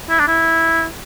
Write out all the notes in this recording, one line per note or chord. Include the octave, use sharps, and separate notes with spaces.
E4
D4
E4